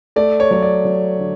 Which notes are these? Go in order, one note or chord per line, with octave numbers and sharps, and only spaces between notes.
A3 D5
C#5
F#3 C#5
D5
F#3
D3